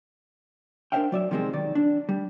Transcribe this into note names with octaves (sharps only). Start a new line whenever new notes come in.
D4 A#4 C5 E5 F5 G5
F#3 D5 E5
C3 D#3 F3 G#3 B3 C4
B1 D#3 D5
D4
G3